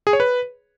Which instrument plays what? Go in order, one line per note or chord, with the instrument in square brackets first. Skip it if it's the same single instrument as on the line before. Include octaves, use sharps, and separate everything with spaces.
[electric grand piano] G#4
C#5
B4